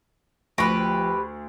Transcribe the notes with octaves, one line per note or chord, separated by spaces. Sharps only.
D2 F3 G4 B4 C#6 A#6